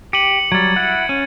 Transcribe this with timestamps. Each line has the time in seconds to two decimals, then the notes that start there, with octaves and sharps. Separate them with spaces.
0.13 G4 C#7 D#7 F#7
0.52 F#3 G3 G#6 A6
0.76 E4 F#5
1.09 C#4 D#7